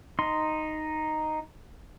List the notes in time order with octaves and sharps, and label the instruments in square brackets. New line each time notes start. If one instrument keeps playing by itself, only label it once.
[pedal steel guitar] D#4 C6